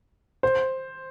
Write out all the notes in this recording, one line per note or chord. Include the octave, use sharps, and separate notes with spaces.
C5